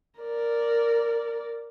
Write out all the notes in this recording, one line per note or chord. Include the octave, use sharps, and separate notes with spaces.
A#4 D5